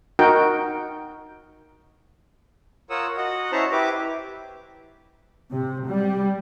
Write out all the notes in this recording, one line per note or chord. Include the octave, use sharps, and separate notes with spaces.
D#4 F#4 A#4 G5
F4 A#4 C#5 F#5 D#6 E6
F#4 D#5 F#5
C#4 E4 C5 E5 A5 A#5
E4 G4 B4 D6
C3
G3